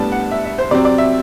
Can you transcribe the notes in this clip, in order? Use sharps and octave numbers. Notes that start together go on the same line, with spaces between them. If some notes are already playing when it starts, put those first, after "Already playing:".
Already playing: A2 G3 B3 D4 A5
F#5
E5
E5
C5
C3 F#3 C4 D5
D5
E5